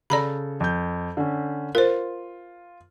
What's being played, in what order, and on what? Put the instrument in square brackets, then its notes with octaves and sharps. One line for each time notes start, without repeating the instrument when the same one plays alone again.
[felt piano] C#3 A4 [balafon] D5 A#5 B5
[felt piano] F2 G6
D3 C#4
[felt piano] F4 [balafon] A#4 C5